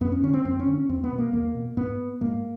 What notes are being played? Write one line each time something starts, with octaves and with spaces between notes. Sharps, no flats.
F#2 B3
C#4
D3 C#4
C4
F#2 C4
C#4
D3
C#4
E2 C4
B3
B2
A#3
E2 A#3
B2
G#2 B3
G#2 A#3